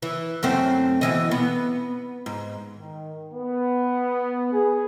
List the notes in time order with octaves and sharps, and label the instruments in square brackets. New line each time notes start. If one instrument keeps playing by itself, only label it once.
[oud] E3
F#2 A3 C4
B2 E3 D#5
B3
G#2
[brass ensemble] D#3
B3
G#4